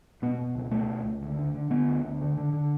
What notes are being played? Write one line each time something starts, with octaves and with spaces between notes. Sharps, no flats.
B2 B3
B2
C#2
B2 A3
C#2
C#2
D2
D3
D3
D3 B3
D2
D2
D3
D3
D3